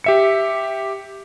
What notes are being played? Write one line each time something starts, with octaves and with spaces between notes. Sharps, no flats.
G4 E5 C#7